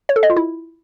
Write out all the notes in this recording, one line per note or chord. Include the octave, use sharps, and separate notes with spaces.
C#5
A4
D#5
F4
E4